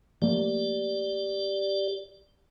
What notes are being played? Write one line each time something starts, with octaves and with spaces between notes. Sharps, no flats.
F3 A3 A#3 G4 D5